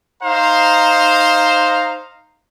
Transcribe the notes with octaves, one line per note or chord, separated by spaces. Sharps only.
D#4 C5 F5 A#5